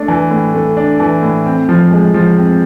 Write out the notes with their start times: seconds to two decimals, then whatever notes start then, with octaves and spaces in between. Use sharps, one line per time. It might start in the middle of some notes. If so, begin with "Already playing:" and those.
Already playing: A3 D4
0.08 E3
0.31 A2
0.55 A3
0.77 D4
1.00 E3
1.23 A2
1.46 C4
1.69 F3
1.91 G#3
2.14 F3
2.37 C4